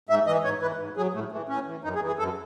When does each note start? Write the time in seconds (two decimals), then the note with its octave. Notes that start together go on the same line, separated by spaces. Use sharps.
0.09 G#2 E5
0.27 E3 D#5
0.44 G#2 C#5
0.61 E3 B4
0.79 G#2
0.97 F#3 G#4
1.14 A2 A3
1.32 E3 A3
1.49 A2 C#4
1.67 E3
1.84 F#2 D#4
1.95 G#4
2.02 E3
2.07 G#4
2.19 F#2 A4